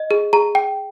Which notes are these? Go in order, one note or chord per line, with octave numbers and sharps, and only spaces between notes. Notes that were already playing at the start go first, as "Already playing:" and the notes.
Already playing: D#5
G#4
G#4 A#5
G5